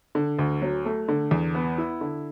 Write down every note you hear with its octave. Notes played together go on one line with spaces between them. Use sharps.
D3
D2
F#3
A3
D3
E2
B3
E4
D3